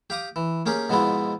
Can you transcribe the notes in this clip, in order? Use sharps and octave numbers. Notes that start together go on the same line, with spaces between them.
G4 F5 D6 D#6
E3
A#3 C#4 G4 G#4 A#4
G#2 B2 F3 G#3 B3 E4